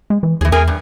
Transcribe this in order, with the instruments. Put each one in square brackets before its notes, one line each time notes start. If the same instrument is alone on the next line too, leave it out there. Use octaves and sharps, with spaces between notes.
[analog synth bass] G#3
E3
[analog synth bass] D#2 [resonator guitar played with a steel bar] E3 G#4
[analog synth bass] E2 [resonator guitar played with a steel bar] G#4 A#4 G#5
[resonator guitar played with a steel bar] G2